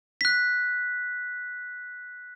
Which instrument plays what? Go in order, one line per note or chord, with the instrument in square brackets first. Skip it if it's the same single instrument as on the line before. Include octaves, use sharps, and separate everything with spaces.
[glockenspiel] F#6 B6